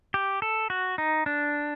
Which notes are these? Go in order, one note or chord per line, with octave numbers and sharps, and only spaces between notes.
G4
A4
F#4
D#4
D4